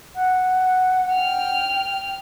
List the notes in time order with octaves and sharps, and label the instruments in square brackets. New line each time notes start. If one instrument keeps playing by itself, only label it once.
[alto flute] F#5
[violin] G5 F6